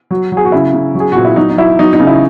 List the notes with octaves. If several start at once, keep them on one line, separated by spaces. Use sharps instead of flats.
F#3
F#3 G#4
F#4
C#3 E4
C#3
F#3
G#4
A#2 F#4
E4
F#3 D#4
D#4
F#3 E4
F#3 D#4
D#4
C#3
E4